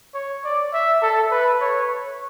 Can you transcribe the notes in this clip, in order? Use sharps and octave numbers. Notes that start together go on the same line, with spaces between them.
C#5
D5
E5
A4
B4
C#5